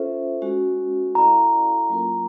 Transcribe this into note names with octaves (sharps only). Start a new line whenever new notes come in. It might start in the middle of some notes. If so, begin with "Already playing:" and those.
Already playing: C#4 F4 A4 C5 E5
G#3 C#4 F#4
E4 A4 D5 F5 A#5
F#3 A#3 C#4 F4 A#4